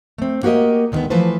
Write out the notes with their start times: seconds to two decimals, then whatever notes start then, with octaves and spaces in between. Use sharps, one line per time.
0.18 A3 C4
0.43 A#3 F#4 G4 A#4 D#5
0.92 D2 D#3 F3 G3 G#3 B3
1.10 E3 F3 A3 A4 B4 C5